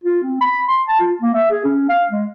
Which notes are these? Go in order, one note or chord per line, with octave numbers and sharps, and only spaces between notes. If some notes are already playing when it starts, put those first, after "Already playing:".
F4
C4
B5
C6
A5
F4
A#3
E5
G#4
C#4
F5
G#3